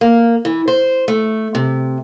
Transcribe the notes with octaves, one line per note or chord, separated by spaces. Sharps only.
A#3
E3
C5
A3
C3